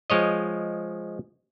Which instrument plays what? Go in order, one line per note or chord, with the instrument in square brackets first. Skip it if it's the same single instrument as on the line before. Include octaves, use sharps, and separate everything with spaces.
[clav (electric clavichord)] F3 G#3 C#5 D#5